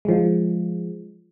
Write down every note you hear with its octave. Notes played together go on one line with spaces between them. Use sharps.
F3 G#3